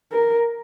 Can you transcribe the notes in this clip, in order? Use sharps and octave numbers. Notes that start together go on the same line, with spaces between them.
A#4